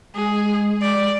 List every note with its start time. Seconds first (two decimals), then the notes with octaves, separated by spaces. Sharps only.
0.15 G#3 G#4
0.81 D5